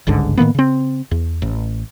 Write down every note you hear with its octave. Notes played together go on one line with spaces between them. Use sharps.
G1 C#2 G#2 D3
A2 D#3 A#3 B3
C#3 C4
E2
A1